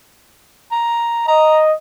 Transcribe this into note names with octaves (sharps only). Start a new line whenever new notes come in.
A#5
D#5 A#5